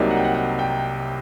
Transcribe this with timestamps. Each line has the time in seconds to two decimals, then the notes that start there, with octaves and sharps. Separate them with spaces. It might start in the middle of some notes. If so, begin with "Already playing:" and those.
Already playing: C2 C3 F#3 A#3 D#4 D5
0.11 F#5
0.17 G5
0.24 F#5
0.34 F#5
0.59 G5